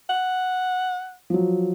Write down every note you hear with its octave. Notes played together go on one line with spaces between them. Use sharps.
F#5
F3 F#3